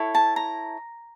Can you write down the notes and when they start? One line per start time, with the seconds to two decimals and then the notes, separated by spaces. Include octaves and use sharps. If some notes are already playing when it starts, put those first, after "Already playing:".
Already playing: E4 A4 C#5
0.15 A5
0.36 A#5